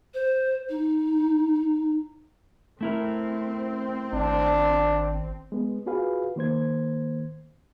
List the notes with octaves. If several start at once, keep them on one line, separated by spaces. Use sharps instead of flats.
C5
D#4
A3 C4 E4 A#4
G#1 D4
G#3 B3
F4 F#4 G#4 B4 F5
D#3 A#3 C5 G#6